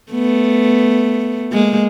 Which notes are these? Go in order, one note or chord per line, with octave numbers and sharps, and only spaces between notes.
A3 B3
G#3 A#3